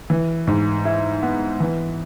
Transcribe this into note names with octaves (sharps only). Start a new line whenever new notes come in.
E3
G#2
E4
B3
E3